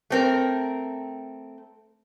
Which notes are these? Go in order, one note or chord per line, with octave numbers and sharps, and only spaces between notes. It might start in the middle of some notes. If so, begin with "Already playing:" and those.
A3 C4 A#4